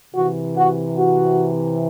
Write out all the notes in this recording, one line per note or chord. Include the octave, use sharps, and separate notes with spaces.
C3 E3 F#4
F#4
F#4